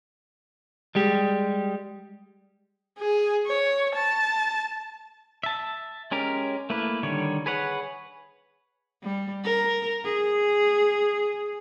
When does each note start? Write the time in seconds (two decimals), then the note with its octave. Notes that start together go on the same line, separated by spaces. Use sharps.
0.95 G3 G#3 G4
2.99 G#4
3.47 C#5
3.94 A5
5.43 E5 A5
6.11 G#3 C#4 G4 A#4
6.70 A3 A#3 E4 B4
7.03 D3 D#3 G3 C#5
7.46 G#4 B4 C#5 F#5
9.03 G3
9.44 A#4
10.04 G#4